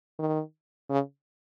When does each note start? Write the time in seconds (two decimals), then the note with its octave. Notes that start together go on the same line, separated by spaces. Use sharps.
0.19 D#3
0.89 C#3